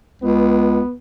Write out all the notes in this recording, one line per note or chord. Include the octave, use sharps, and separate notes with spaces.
C#2 B3